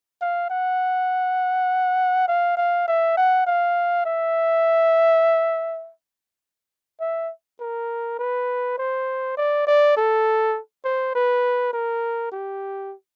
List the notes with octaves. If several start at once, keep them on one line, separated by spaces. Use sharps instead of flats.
F5
F#5
F5
F5
E5
F#5
F5
E5
E5
A#4
B4
C5
D5
D5
A4
C5
B4
A#4
G4